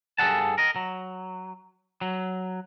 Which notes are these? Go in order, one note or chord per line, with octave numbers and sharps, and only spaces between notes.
G2 G#4 A4 F#5 A5
A#4 D#5
F#3
F#3